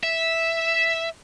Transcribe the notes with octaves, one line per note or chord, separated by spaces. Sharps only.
E5